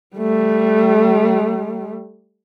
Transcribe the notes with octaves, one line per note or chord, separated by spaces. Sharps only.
G3 A3